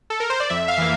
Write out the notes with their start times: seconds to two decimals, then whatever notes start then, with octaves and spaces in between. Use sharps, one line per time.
0.10 A4
0.20 A#4
0.30 C5
0.40 D5
0.50 F2 E5
0.68 F5
0.78 E3 A#3